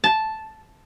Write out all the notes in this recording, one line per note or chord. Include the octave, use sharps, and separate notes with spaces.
A5